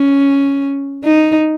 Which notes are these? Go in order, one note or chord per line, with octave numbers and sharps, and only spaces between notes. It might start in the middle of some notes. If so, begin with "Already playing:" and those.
Already playing: C#4
D#4